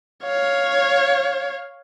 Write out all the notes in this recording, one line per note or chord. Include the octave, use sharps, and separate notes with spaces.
C#5 F5